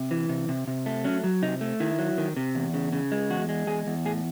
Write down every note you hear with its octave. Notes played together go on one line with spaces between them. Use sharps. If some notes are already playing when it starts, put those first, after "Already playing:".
Already playing: C3
E3
C3
C3
C3
A3
F#3 C#4
F#3
C3 D#4
A3
D#3 E4
F#3
D#3
C3
E2
C#3
C#3
G#3
E2 F#4
G#3
E2 G#4
E2
A2 G#4